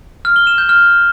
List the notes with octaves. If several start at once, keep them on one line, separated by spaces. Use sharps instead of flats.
F6
G7
E7
G6
F6